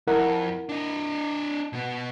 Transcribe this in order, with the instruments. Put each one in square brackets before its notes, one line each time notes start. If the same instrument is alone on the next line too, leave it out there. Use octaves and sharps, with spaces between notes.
[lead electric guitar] F2 [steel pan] E4 A#4 F#5
[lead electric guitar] D4 D#5
B2 B3